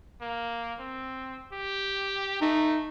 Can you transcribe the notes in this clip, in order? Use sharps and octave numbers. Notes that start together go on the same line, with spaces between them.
A#3
C4
G4
A3 D#4